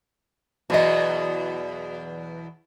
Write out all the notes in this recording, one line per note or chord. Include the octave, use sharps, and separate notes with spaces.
E2 B2 F#3 F#4 D#5